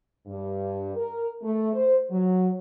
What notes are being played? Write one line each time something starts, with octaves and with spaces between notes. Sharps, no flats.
G2
A#4
A3
C5
F#3